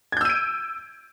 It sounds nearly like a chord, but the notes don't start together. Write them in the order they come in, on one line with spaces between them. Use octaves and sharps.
G#6 G6 E6 D#7 D7